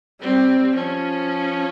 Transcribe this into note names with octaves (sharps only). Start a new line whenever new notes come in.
G3 C4
F3 C#4